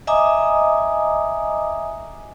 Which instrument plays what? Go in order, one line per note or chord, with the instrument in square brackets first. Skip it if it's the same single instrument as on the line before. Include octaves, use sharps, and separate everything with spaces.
[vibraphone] D#5 E5 G#5 A#5 D6 D#6